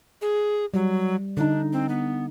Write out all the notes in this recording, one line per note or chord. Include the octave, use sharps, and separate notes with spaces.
G#4
F#3 G3
D3 D4 D#4
C4
B3